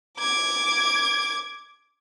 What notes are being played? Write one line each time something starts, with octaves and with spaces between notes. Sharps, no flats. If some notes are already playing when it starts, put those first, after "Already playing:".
D6 G#6